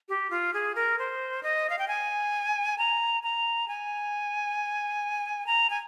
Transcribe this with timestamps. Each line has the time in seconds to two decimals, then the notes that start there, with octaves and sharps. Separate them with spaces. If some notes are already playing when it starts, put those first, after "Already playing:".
0.09 G4
0.30 F4
0.54 G#4
0.75 A#4
0.99 C5
1.43 D#5
1.70 F5
1.79 G5
1.88 G#5
2.78 A#5
3.23 A#5
3.68 G#5
5.47 A#5
5.70 G#5